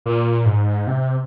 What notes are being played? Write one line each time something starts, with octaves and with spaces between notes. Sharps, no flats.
A#2
G#2
C3